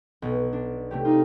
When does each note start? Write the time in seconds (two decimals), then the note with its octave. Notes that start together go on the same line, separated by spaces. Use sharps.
0.22 B1 B2
0.53 D4
0.91 C3 A3 G4
1.05 D#4 F4